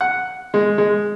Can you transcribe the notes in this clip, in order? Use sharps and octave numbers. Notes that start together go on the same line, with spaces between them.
F#5
G#3
G#3